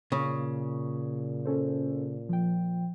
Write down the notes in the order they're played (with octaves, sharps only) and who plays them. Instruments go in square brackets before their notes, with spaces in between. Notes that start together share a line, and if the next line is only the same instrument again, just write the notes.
[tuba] A#2 [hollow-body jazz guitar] C#3
[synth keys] C#4 A4 C5
F3 G5